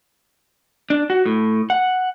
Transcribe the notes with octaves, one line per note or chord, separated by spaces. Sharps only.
D4
F#4
A2
F#5